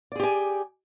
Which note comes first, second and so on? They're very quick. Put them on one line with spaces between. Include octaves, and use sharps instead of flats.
D5 G#4 G4 G#5